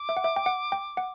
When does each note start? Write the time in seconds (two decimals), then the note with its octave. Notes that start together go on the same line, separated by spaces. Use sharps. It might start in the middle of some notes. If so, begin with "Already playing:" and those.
Already playing: D6
0.09 E5
0.17 F#5
0.24 E5
0.36 G5
0.46 F#5
0.72 G5
0.97 F#5